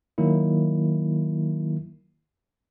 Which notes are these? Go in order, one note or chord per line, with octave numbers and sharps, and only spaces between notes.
D#3 F#3 A#3 E4